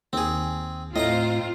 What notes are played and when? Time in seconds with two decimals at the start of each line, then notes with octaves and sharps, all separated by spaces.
0.13 D#2 C4 G#4
0.96 A2 C4 F4 D#5 F5 A#5